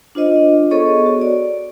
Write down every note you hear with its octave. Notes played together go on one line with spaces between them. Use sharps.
D4 F4 C5 D#5
B3 G#4 A4 C#5 D#5 C#6
F#4
D5